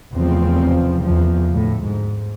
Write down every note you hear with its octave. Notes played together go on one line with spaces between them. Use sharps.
F1 E2 C#3 F3 C4
E2 F3
D2 A2
G#2